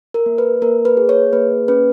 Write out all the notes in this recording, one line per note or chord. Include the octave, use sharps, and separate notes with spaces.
A#4
A#3
B4
A#3 A#4
B4
G#4
C#5
A#3 B4
C#4 B4